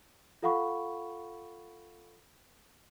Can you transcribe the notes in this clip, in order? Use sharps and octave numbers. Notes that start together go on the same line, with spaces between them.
F4 A4 F5 F#5 B5 C#6